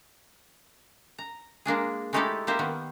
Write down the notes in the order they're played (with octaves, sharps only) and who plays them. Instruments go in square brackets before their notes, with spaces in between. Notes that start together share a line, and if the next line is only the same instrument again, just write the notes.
[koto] A#5
G#3 A#3 D4 G#4
G#3 A3 D#4 E4 G4 A4
A#3 G4 C5 E5
D#3 B3